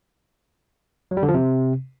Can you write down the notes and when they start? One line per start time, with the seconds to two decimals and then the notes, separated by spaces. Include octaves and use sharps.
1.11 F#3
1.17 G3
1.23 D3
1.28 F3
1.34 C3